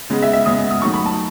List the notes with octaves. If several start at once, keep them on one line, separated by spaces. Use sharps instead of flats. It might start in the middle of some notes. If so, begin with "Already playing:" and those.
C#3 G#3 B3
E5
E5
C#3 G#3 B3 D#6
D#6
D#3 F#3 A3 C#6
B5
A5